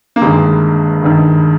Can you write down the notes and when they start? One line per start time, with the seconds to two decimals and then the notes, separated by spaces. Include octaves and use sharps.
0.16 A#3
0.22 G1 G2 D#3 G#3
1.02 G1 G2 D#3